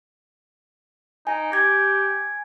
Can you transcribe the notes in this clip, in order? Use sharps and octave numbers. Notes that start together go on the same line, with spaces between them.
D#4 G#5
G4 G#5 G#6